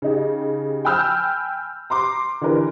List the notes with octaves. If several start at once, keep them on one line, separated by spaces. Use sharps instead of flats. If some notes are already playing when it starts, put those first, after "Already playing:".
C#3 D#4 G4
G5 G#5 B5 E6 F6 G6
A#5 C6 D6
D3 E3 G4 A#4 B4